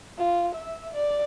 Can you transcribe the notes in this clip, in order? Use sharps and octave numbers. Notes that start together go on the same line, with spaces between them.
F4
E5
D5